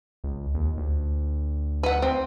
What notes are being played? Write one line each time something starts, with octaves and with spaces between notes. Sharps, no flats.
C#2
D#2
D2
B4 F#5
C4